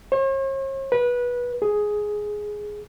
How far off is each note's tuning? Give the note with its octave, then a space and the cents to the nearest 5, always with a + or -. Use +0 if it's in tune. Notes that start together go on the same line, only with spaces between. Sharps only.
C#5 -45
B4 -20
G#4 +5